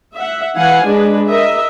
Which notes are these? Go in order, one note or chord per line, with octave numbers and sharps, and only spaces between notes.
E5 F#5
E3 F5 F#5 G#5
G#3 D4 B4
A#4 D#5 E5